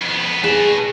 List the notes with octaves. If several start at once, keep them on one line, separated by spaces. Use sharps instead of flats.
F2 B3
G#4 B4 A5